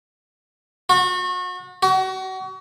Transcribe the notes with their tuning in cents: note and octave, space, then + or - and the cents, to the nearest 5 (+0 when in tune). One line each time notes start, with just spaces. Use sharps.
F#4 -35
F#4 +30